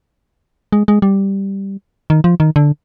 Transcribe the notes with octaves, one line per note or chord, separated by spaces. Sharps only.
G#3
G#3
G3
D#3
F3
D#3
D3